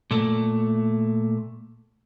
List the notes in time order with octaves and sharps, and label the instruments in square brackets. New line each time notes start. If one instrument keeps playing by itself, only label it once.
[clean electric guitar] A#2 A3